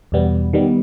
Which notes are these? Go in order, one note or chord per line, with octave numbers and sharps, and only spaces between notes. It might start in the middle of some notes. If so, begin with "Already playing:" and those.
E2 B2 G3 B3
D#3 G3 B3